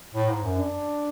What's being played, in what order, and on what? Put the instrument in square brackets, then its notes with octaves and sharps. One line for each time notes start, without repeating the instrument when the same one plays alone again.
[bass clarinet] A2
G#2
F#2
[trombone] D4